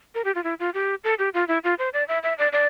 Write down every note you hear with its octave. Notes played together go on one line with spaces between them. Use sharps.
A#4
G4
F4
E4
F4
G4
A4
G4
F4
E4
F4
C5
D5
E5
E5
D5
D5